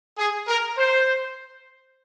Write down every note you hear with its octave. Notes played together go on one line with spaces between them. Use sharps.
G#4
A#4
C5